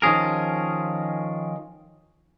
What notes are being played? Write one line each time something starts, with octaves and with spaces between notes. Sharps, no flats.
D#3 F3 C#4 G#4 A#4